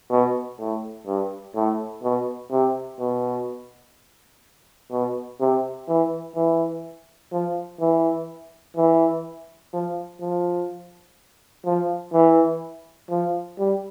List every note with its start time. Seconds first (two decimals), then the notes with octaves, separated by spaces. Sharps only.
0.11 B2
0.59 A2
1.07 G2
1.56 A2
2.04 B2
2.51 C3
3.00 B2
4.92 B2
5.41 C3
5.89 E3
6.36 E3
7.33 F3
7.81 E3
8.77 E3
9.73 F3
10.21 F3
11.66 F3
12.14 E3
13.10 F3
13.58 G3